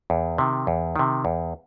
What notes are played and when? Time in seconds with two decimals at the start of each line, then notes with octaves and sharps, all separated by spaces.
0.10 E2
0.38 C3 D#3
0.67 E2
0.96 C3 D#3
1.25 E2